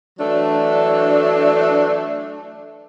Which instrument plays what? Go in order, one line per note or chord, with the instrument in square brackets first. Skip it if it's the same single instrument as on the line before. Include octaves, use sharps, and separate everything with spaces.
[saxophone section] E3 F#3 A3 D4